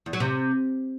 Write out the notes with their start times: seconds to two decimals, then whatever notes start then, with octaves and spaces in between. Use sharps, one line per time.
0.06 E2
0.13 F#3
0.20 C3